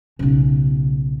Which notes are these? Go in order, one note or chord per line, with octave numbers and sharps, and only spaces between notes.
B1 C#3